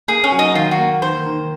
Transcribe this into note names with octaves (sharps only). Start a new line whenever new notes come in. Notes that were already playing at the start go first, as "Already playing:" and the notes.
A#3 G#4
C#4
F#3
D#4
D#3 F4
F#4
A#3
D#3 C5
D#3